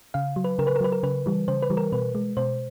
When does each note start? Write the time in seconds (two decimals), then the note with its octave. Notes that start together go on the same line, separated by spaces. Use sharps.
0.14 C#3 F5
0.36 F#3
0.44 B4
0.59 C#3 A#4
0.67 B4
0.76 A#4
0.81 F#3 B4
0.92 A#4
1.03 C#3 B4
1.26 E3 G3
1.48 C#3 C5
1.62 B4
1.70 E3 G3
1.77 A#4
1.92 B2 B4
2.15 G#3
2.37 B2 C5